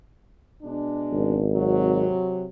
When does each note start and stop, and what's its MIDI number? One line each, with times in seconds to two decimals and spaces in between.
0.63 1.45 47
0.63 1.45 56
0.63 1.45 62
1.12 2.05 32
1.52 2.45 48
1.52 2.45 54